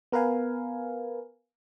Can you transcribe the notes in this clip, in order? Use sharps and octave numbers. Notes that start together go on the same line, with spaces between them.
B3 A#4 B4 F5 G#5